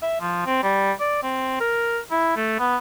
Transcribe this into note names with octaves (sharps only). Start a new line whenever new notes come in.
E5
F3
C4
G3
D5
C4
A#4
E4
A3
B3